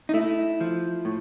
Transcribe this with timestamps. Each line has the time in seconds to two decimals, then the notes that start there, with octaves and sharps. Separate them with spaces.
0.09 D#4
0.14 A3 E4
0.60 F3
1.05 A2